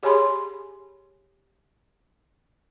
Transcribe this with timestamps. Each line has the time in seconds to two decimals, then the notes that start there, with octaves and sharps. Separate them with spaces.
0.03 G4 G#4 C#5 G#5 B5 C6